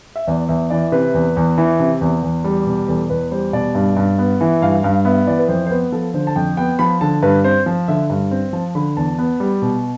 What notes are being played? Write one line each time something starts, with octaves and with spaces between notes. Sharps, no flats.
E5
E2 D5
E2 E5
E3 D5
C3 B4
E2
E2
E3
C3
E2
E2
G3
B2
E2 A4
E2 B4
G3 C5
B2 D5
G2
G2
B3
E3
G2 F5
G2 F5
B3 E5
E3 D5
B4
F2 C5
C5
B3 B4
F3 A4
D3 C5
A5
F2 G5
B3 G5
F3 B5
D3 A5
G2 B4
C4 C5
F3
D3 E5
G2
C4
F3 A5
D3 B5
E2 A5
B3
G3
B2